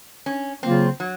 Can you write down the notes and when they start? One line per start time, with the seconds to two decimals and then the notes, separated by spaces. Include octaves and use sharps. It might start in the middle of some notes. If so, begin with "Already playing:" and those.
0.26 C#4
0.63 C#3 F#3 A#3 C4 F4
1.00 F#3